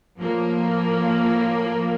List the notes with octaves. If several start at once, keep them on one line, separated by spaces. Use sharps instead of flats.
A2 F3 A#3